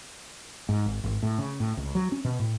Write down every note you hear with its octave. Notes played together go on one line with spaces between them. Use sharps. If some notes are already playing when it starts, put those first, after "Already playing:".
G#2
G#1
G#1
A2
C#3
A2
C#2
F#3
C#4
B2
A2